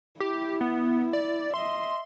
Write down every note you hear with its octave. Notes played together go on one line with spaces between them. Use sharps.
E4 G4
B3
D5
D#5 E5 C6